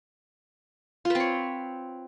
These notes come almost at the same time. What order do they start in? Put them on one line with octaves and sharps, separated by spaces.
F4 B4 C4 C#5